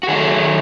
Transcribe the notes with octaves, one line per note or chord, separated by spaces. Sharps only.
F#4
D#3 F#3 A3 G#4